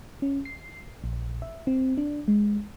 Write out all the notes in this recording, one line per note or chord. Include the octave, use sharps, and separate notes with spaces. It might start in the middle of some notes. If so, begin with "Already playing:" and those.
C#4
C7
A#1
E5
C4
D4
G#3